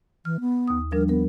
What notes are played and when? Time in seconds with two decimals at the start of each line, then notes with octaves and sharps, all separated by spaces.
0.25 E3 F6
0.40 B3
0.68 D#2 D#6
0.92 F3 G3 D4 A#4
1.09 B3 A#4